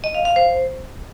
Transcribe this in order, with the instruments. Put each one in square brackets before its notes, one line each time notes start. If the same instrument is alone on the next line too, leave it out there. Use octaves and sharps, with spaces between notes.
[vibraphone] D#5
F5
F5
C5